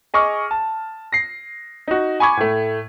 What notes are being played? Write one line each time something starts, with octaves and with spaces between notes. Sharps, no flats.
G#4 D#5 C#6 D6 F6
A5
A#6 C7
D#4 F#4
G#5 B5 C#6 D6 G#6
A2 A3